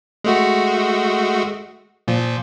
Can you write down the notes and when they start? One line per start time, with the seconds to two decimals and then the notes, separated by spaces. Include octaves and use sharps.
0.24 G#3 A3 F#4
2.08 A#2 F3